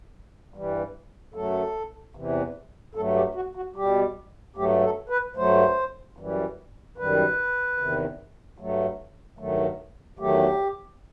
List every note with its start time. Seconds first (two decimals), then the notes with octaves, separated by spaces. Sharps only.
0.54 G2 E3 G3
1.34 F#2 F#3 A3 A4
2.15 E2 C3 E3
2.95 G2 F#3 A3 A4
3.16 G4
3.35 F#4
3.55 F#4
3.76 B2 G3 G4
4.56 G2 F#3 A3 G4
4.82 A4
5.09 B4
5.36 G2 F#3 A3 C5
6.17 F#2 E3 G3
6.97 F#2 D#3 G3 B4
7.77 E2 C3 D#3
8.58 G2 F#3 A3
9.39 G2 D#3 F#3 A3
10.19 E2 D#3 F#3 A3 G4